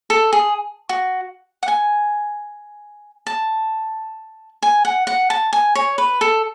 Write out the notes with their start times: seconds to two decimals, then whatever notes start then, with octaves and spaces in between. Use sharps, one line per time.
0.10 A4
0.33 G#4
0.89 F#4
1.63 F#5
1.68 G#5
3.27 A5
4.63 G#5
4.85 F#5
5.07 F#5
5.30 A5
5.53 G#5
5.75 C#5
5.98 B4
6.21 A4